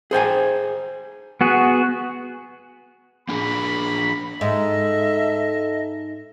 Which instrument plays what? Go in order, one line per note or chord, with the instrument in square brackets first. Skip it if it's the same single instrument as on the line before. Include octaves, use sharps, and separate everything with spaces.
[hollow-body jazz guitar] G#4 C5 G5 G#5
[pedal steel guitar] B3 F#4 G#4
[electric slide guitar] A#3 D4 G#4 [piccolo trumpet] B5
[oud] G#2 [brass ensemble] A4 [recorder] D#5 [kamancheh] E5